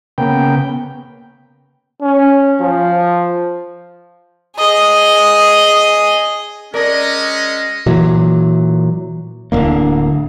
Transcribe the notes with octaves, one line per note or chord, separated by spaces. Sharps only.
C#3 A#3 B3 G5
C#4
F3
G#4 D#5
G#3 C#4 A#4 D5 D#5
A#2 E3 F#3
D1 D3 A#3